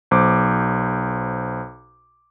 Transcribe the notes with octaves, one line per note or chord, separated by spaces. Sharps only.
B1 C5 D6